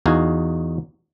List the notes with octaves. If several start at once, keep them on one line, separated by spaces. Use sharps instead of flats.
E2 D#4 F#4 F5 G#5